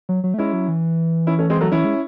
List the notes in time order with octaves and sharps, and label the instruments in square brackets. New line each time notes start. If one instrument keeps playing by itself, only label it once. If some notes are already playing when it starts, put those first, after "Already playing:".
[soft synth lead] F#3
F#3
A3
[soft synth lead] G#3 [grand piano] C#4 E4
[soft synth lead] F#3
E3
[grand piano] C#4 E4
A3 C#4
G#3 C4
F#3 A3
[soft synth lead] E3 [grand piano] C#4 E4
[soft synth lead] G#3